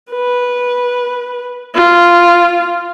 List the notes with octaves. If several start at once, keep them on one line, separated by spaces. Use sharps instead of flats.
B4
F4